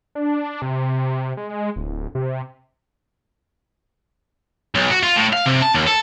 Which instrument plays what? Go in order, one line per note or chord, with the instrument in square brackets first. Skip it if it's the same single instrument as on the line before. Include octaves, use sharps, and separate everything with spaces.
[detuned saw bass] D4
C3
G#3
D1
C3
[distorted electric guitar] B1
F#4
F4
A2
F5
C3
A5
D#2
A4